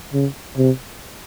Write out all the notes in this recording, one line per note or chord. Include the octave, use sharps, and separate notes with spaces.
C#3
C3